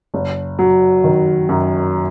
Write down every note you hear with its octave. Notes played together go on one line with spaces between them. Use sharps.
F#1
F#3
D#3
F#2